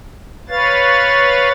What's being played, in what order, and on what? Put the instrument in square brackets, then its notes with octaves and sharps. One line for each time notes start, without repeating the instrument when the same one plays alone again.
[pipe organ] B4 C#5 F5 A6